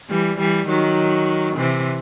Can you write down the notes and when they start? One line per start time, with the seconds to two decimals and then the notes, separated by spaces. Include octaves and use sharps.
0.09 E3 G3
0.39 E3 G3
0.69 D#3 F#3
1.57 C3 E3